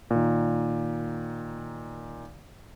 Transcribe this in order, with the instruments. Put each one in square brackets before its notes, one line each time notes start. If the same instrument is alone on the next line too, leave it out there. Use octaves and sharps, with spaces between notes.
[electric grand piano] A#2 D#3